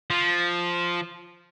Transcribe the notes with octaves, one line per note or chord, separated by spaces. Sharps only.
F3